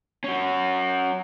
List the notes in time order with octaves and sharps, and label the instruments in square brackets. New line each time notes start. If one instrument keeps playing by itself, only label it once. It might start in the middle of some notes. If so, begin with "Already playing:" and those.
[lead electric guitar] C#4 F#4